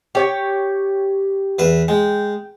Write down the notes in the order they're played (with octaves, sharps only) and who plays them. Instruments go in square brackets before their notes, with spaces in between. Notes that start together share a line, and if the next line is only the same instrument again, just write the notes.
[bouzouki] G4 C#5 G5
[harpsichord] E2 B4 E5
[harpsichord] G#3 [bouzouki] G5